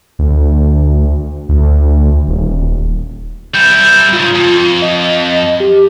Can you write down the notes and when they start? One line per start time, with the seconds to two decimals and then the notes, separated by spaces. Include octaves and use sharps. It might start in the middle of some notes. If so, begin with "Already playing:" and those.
0.19 D2
1.49 D2
2.28 D#1
3.54 G3 E4 G6
4.13 G#2 C#3 F4
4.35 F2
4.82 D#5
5.60 G4